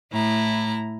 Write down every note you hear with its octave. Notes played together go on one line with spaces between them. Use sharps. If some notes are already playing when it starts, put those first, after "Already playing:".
A2 E4 A#5